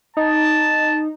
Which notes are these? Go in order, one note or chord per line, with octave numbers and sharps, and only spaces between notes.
D#4 A5